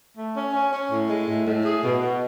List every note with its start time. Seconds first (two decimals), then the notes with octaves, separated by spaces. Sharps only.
0.16 A3
0.36 C#4
0.53 C#4
0.72 C#4
0.91 A2
1.10 G#3
1.28 A2
1.47 A2
1.64 G#4
1.84 B2
2.01 B2